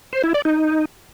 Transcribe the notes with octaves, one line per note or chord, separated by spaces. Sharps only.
C5
E4
D5
D#4